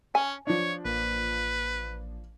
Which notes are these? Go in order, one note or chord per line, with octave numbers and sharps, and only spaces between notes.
C#4 G#5
F3 D4 C#5
A1 A#3 B4